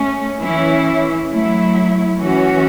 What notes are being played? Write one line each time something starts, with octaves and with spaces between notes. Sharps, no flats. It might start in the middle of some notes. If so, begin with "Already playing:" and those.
Already playing: A3 C#4
E3 C#4 E4
F#3 A3 E4
E3 C#4 F#4